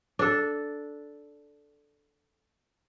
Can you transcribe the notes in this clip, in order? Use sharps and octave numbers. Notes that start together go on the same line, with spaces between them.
D4 A4